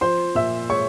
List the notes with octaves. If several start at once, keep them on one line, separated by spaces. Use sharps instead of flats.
F3 C5 C6
A#2 E5 E6
G#3 C#5 C#6